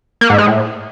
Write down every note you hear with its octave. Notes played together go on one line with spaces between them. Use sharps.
A#3
G#2
G#3
A2